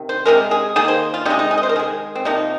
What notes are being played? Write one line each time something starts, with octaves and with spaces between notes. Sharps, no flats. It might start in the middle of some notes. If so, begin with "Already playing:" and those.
Already playing: C3 D#3
C5
C3 F3 G#3 A#4
G#4
D#3 A#3 G#4
C5
F4
C3 G#3 D#4
D#4
G#4
D#5
C5
A#4
D#3 G#3 G#4
C4
C3 F3 A#3 D#4